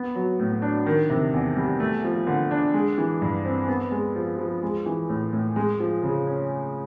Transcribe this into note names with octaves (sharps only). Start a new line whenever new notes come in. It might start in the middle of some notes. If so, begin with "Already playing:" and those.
Already playing: B3
F#3
A2
D4
D#3
C3
E2
G3
A3
F3
D3
D4
G#3
E3
G2
C4
B3
G#3
F3
F3
G#3
E3
A2
A2
G#3
F3
C#3
C#4